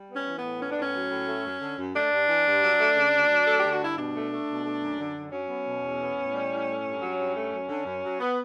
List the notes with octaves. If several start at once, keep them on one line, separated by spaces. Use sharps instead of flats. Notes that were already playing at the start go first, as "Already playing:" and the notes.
Already playing: G3
B3
C#4
E3
B3
A2
B3 C#4
D4
A2 C#4
F#3
A2
A3
F#2
D3
F#2
A3 D4
G2
E3
G2
F#3
A3
C#3
D2
F#3
A3 A4
G4
D3
F#4
G2 E4
B2 D4
A3
A3
B2
A3
F#2
D3
F#2
F#3 C#4
B3
B2
E2
B3
A2
G3
A2
A3
G2
F#3
G2
A3
F#2
D3
F#2
F#3
B3